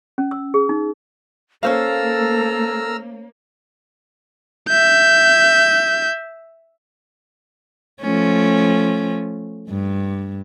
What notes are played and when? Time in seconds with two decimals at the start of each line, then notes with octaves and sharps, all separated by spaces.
0.18 C#4
0.31 E6
0.54 G#4
0.69 D#4
1.63 A#3 C#4 A4 C5 F5 A#5 E6 F6
4.69 E5 G6
8.01 F3 A3 C#4
9.69 G2